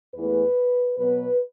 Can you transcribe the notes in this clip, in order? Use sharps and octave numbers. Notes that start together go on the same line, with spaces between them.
E2 E3 A3 B4
B2 F#3 B3 B4